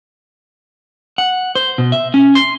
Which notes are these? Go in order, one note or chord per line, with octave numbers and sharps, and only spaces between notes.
F#5
C5
B2
E5
C#4
C6